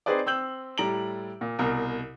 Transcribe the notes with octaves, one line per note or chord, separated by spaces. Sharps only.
C4 D#4 G#4 B4 C5 D5
C4 E6 G6 F#7
A2 G3 A#5 D7 F#7
A#2
C2 B2 A#4